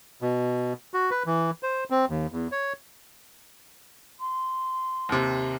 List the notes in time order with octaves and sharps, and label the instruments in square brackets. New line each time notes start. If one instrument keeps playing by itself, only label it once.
[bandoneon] B2
F#4
B4
E3
C5
C4
D#2
E2
C#5
[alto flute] C6
[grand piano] D#2 C3